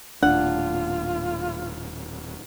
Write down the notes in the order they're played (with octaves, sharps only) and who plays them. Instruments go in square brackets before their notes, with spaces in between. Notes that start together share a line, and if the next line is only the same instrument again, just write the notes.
[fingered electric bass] D#1 A2 [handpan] D4 [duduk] F4 [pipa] F#5